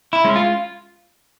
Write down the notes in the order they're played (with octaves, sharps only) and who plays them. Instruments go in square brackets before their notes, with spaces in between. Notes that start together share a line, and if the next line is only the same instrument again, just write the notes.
[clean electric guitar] E4
G#3 C#4
F4